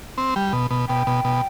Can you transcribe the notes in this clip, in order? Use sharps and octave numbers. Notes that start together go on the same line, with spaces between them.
C4
G3
B2
B2
B2 G5
B2
B2